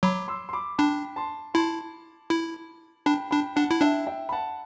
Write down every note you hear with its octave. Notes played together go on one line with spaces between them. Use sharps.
F#3 B5 D6
C6 E6
C6
B5 D6
D4 G5 B5
A5 C6
E4 A5 C6
E4
D4 G5 B5
D4 G5 B5
D4 F#5 A5
E4
D4 E5 G5
E5 G5
B5
F#5 A5